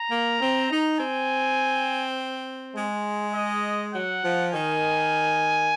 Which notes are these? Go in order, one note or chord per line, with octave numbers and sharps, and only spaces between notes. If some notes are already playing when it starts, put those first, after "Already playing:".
Already playing: A#5
A#3
C4
D#4
C4 G#5
G#3
D#5
F#3 F#5
F3
D#3 G#5